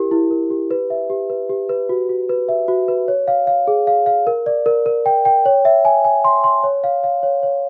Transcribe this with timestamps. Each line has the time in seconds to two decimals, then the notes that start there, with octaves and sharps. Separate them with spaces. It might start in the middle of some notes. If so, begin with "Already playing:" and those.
Already playing: E4 G4 A#4
0.11 E4
0.31 A#4
0.50 G4
0.71 B4
0.90 E5
1.10 G4
1.30 B4
1.49 G4
1.69 B4
1.89 F#4
2.09 F#4
2.29 B4
2.49 E5
2.68 F#4
2.88 B4
3.08 C#5
3.28 F5
3.47 F5
3.68 G#4
3.87 F5
4.06 F5
4.27 A#4
4.46 D5
4.66 A#4
4.86 A#4
5.06 G5
5.25 G5
5.46 C#5
5.65 E5
5.85 G#5
6.05 G#5
6.24 C6
6.44 C6
6.64 C#5
6.84 F5
7.04 F5
7.23 C#5
7.43 C#5